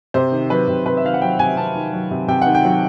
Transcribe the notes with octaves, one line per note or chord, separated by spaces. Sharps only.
C3 C5
D#3
F#3 B4
C3
C3 B4
E5
D#3 F5
F#5
F#3 G5
C3 G#5
C3 A5
D#3
F#3
C3
C3 G5
D#3 F#5
G5
F#3